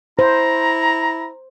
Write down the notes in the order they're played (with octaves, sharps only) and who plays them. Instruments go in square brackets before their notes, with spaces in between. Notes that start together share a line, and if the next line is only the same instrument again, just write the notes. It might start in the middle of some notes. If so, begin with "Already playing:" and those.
[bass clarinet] E4 [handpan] C5 [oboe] A#5